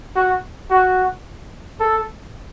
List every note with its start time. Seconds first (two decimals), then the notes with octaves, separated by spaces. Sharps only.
0.16 F#4
0.70 F#4
1.80 A4